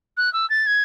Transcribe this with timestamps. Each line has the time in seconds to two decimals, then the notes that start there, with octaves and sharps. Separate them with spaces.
0.17 F#6
0.33 E6
0.50 A6
0.67 G#6